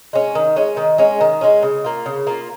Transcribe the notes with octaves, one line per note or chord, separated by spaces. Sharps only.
G#3 C#4
D#3
G#3 C#4
D#3
G#3 C#4
D#3
G#3 C#4
C#3
A#3 F4
C#3
A#3 F4